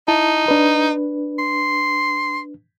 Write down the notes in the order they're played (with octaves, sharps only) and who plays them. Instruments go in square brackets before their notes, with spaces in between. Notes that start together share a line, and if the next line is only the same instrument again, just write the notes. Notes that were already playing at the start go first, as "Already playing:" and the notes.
[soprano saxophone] D#4 [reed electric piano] E4 A5
[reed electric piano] D4 B4
[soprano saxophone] C6